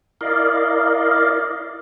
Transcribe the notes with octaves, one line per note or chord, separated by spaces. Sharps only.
E4 A#4 D5 D#5 F5